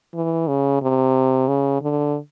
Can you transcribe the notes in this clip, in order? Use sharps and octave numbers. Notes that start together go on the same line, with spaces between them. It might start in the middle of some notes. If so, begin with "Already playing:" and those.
E3
C#3
C3
C#3
D3